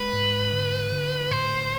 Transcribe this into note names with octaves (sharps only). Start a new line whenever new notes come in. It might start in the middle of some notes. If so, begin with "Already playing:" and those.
Already playing: G#3 B4
G#2
D3
D3
A2 C5